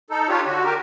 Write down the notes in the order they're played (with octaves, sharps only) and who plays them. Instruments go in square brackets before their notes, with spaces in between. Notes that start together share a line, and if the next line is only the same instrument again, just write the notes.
[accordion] D#4 A4
D4 F4 G4 C#5
D3 F#4
G4 A#4